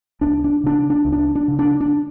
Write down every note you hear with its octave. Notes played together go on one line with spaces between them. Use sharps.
C#2 D4
D4
C#3 D4
D4
C#2
D4
D4
C#3
D4
D4